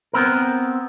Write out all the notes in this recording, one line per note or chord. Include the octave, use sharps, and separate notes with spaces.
B3 C4 A#4